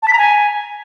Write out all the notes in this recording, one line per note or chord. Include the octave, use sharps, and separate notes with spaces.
A5
B6
A#5
G#5